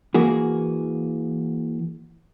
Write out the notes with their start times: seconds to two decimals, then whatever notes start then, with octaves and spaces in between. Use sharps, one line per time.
0.14 E3 A#3 F#4 G#4